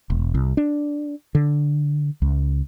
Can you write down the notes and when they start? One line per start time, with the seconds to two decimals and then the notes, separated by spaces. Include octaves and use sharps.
0.10 E1
0.34 C2
0.57 D4
1.35 D3
2.22 C#2